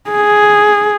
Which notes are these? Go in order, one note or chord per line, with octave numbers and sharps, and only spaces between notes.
G#4